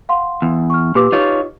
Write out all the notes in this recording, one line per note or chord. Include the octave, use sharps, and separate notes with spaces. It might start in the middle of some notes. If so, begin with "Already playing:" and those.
F5 F#5 C6
E2
C#6 F6
A#2 G4 B4 D6
D#4 F4 C#5